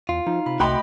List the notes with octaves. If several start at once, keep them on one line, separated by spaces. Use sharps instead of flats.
E2 F4
F3 D#4
C3 B5
C2 A3 F#4 D#5 G5 B5 C6